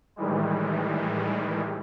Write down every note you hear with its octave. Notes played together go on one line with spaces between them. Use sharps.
A2 D#3 E3 G3 G#3